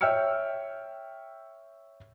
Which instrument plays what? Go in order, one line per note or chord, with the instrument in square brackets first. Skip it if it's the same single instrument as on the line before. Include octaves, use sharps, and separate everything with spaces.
[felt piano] C#5 E5 G5 E6 F6 C#7